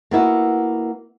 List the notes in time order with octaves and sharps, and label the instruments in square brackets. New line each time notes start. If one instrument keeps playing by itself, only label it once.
[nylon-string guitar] A#3 B3 E4 F#4